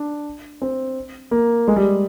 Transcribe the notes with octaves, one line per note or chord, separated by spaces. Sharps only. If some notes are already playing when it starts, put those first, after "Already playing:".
Already playing: D4
C4
A#3
G#3
G3